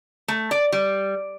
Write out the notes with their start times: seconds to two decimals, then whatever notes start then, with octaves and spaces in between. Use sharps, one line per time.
0.28 A3
0.51 D5
0.72 G3